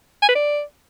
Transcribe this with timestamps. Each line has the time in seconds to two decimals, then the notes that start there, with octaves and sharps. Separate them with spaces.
0.22 G#5
0.29 B4
0.35 D5